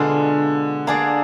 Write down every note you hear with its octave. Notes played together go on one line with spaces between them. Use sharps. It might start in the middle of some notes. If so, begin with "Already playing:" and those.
Already playing: B2 D3 G#3 D4 F4
A#3 D4 G#4 D5